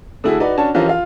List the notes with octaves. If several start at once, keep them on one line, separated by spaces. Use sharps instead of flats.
D3 A3 E4 F#4 G#4
D#4 F#4 B4 D5
C#4 D4 F#4 C#5 A5
E3 F3 C#4 F4 G4 A#4
F4 F5